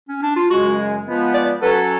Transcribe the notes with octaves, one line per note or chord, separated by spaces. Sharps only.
C#4
D4
F4
F#2 C#3 G#3 F#4
F3 G#3 B3
D5
F#3 C#4 F#4 A4 B4